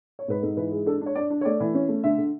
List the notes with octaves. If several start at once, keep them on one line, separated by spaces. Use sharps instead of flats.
C#5
G#2 B4
G#2 A4
E3 B4
G#3
D4 A4
D4
C#5
D4 D5
D4
C#5
A3 D5
E3
C#4
A3
D3 E5
D3